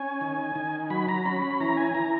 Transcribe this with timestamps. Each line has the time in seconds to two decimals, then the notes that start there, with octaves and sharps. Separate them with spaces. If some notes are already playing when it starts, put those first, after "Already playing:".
Already playing: C#4 G#5
0.21 D#3
0.56 D#3
0.90 F#3 B5
1.08 A#5
1.25 C#4 B5
1.42 B5
1.61 E3 A#5
1.77 G#5
1.95 E3 A#5